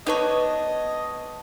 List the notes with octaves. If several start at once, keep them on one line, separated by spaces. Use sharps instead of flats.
B3 D4 D#4 B4 C#5 D#5